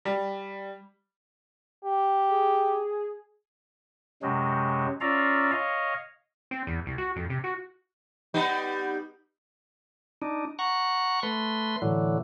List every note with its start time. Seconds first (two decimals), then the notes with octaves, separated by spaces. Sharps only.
0.05 G3
1.84 G4
2.29 G#4
4.22 F#2 C3 F#3 G#3
5.01 C#4 F4 D5 E5 F5 A#5
5.52 C#5 D#5 F5
6.51 C4
6.67 E2
6.86 C2
6.98 F#4
7.16 F2
7.30 C3
7.44 F#4
8.34 G3 B3 D#4
10.22 D4 D#4
10.59 F#5 A#5 C#6
11.23 A3 B4 C6
11.82 A2 D3 E3 F#3